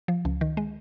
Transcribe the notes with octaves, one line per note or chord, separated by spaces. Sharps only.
F3
C#2
D#3
G#3